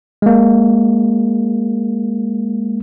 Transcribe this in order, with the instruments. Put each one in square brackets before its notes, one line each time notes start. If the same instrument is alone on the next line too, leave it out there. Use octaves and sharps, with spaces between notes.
[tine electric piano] G#3 A#3